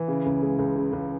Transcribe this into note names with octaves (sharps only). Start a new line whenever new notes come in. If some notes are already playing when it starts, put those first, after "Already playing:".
Already playing: E3
C#3
C#2
G#3
C#2
C#3
C#2